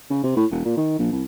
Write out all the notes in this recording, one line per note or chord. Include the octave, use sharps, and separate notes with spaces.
C#3
C3
A2
E1
A#2
D#3
A#1
C2